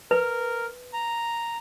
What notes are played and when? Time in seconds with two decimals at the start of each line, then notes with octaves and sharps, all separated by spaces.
0.11 A#4 B4
0.93 A#5